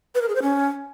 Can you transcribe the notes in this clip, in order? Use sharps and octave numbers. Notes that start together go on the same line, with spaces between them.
B4
A#4
G#4
C5
C#4